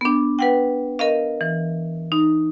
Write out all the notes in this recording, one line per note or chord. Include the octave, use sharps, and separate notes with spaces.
B3 D4
B4 F#5 G5
A#4 D#5 F5
E3
D#4